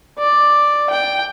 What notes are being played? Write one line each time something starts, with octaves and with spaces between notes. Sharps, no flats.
D5
G5